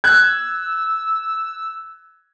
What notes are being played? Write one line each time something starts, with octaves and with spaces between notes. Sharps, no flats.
E6 F#6 G#6